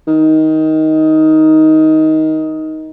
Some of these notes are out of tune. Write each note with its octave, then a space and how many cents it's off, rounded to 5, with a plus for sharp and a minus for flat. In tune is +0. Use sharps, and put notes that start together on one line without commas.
D#3 +15